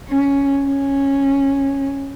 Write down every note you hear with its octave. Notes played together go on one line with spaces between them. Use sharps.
C#4
C#4